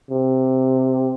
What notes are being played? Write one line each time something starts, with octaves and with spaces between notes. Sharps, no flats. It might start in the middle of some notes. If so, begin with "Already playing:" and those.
C3